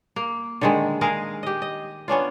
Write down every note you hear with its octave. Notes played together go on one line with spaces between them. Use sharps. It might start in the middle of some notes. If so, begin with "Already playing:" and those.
A#3
D3 D#3 G#3
G#3 G#4 A#4 F5
G4 D#5
D#5
B3 C#4 D4 F4